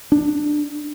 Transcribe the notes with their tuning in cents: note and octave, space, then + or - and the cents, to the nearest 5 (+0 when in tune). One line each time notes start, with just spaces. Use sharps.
D4 +15